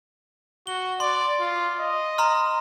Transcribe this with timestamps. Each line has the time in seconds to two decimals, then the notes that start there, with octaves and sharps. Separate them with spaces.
0.67 F#4 G7
1.00 D5 C6
1.40 F4
1.80 D#5
2.18 A#5 C6 F6